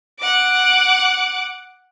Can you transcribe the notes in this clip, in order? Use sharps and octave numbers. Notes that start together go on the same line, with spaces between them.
F#5 D6